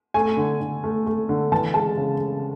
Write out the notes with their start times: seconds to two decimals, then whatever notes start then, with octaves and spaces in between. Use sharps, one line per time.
0.14 A3 G#5
0.37 D3
0.61 D3
0.84 A3
1.06 A3
1.29 D3
1.52 E3 A5
1.74 G#3 A5
1.97 C#3
2.20 C#3